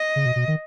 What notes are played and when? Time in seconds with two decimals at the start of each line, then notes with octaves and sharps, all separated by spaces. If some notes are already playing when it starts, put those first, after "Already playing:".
Already playing: D#5
0.16 C#3
0.26 B2
0.36 B2
0.48 D#3